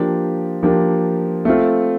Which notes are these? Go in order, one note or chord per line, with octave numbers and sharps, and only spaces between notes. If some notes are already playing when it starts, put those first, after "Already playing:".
Already playing: F3 A#3 D4 G4
F3 A#3 D4 G4
A3 C4 F4